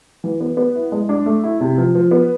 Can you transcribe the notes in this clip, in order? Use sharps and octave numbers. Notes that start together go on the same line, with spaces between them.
E3
B3
B3
E4
G#3
D4
A3
E4
C3
F3
F3
B3